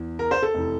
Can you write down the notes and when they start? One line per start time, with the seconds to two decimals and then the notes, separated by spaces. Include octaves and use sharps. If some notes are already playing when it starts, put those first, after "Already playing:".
Already playing: E2 E3
0.19 A#4
0.31 C5
0.42 A4
0.54 F1 E3